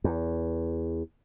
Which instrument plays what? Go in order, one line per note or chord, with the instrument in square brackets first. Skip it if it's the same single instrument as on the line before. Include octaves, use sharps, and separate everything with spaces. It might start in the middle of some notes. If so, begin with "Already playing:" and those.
[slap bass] E2